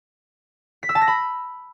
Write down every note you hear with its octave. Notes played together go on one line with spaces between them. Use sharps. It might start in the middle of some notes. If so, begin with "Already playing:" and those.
B6
E6
A5
A#6
B5